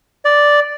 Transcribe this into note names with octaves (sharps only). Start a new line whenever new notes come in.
D5